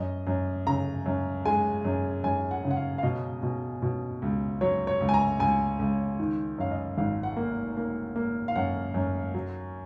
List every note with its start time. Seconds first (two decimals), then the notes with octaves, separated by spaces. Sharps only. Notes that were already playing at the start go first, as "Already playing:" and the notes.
Already playing: F#2 D#5
0.27 F#2
0.67 C#3 A#5
1.06 F#2
1.45 G#3 G#5
1.85 F#2
2.24 F#2 G#5
2.51 F#5
2.64 C#3
2.71 F#5
2.76 F5
2.98 F5
3.03 B2 D#5
3.43 B2
3.82 B2
4.22 C#2
4.61 F#3 C#5
4.87 C#5
5.00 C#2
5.09 G#5
5.14 A#5
5.40 C#2 G#5
5.79 C#2
6.19 D#3
6.58 F#2 F5
6.71 D#5
6.98 G#1 F5
7.23 F#5
7.36 A#3
7.77 A#3
8.16 A#3
8.48 F5
8.56 F#2 F#5
8.94 F#2
9.34 F#3